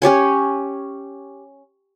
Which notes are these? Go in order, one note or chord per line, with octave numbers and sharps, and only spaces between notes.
C#4 G4 C#5 G#5